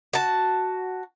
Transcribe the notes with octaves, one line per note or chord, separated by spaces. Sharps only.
F#4 A5